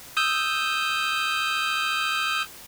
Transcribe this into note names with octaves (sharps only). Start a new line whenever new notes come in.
D#6 E6 G6